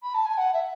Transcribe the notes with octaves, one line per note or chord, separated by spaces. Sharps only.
B5
A5
G#5
F#5
E5